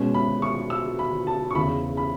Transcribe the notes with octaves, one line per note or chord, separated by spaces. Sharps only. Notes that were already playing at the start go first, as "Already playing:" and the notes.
Already playing: B2 G#3 C#4
B5
C#6
E6
B5
A5
C#6
E2 C#3 E3 B5
B5